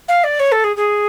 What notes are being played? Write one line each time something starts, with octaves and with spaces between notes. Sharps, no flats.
F5
D5
C#5
A4
G#4
G#4